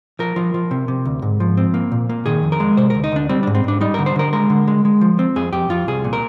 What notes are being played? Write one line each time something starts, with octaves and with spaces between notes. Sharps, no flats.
F3 A#4
F3
F3
C3
C3
D2
G#2
F3
C4
A#3
A#2
A#3
D#3 G#4
F2
A#4
G#3
C3 C5
D2 A#4
D#4
D2 D4
G3 C4
G#2 D4
C4
G#2 D4
G3 D#4
D3 A#4
C5
D3 A#4
G#3 A#4
D3
G#3
G#3
F3
C4
F2 G#4
F2 G4
F2 F4
C2 G#4
A#2
A#4